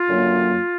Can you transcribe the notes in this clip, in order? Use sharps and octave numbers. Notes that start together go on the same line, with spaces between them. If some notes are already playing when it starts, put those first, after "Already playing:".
Already playing: F4
F#2 D3 F#3 A#3